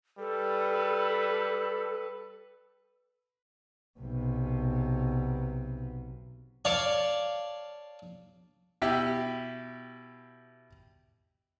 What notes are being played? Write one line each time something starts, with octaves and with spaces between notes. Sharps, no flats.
G3 A4 B4
B1 C3
C#5 D5 F5 A5
B2 E4 G4